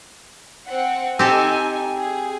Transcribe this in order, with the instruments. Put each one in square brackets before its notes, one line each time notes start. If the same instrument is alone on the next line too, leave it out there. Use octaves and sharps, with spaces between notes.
[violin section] C4 F#5
[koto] C4 G4 A4 [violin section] D#4 G#5
[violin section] G#4